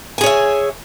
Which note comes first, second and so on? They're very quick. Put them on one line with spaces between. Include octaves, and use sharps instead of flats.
G#5 G#4 C#5 E5